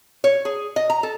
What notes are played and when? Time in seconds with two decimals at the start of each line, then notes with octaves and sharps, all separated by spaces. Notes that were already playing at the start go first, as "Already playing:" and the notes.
0.24 C#5
0.45 G#4
0.76 D#5
0.90 A#5
1.03 A4